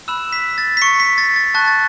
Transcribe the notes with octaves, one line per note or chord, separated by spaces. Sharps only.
B5 E6 F#6 E7
B6
A6
B6
C#6 C#7
B6
A6
A6
A5 C#6 F#6 A6
A6